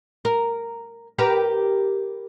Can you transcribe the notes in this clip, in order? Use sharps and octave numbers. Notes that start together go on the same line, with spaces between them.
A#4
G4 A#4 B4